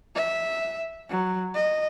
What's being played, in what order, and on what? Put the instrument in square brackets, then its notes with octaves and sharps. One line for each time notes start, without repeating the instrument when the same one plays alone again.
[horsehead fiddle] E5
F#3
D#5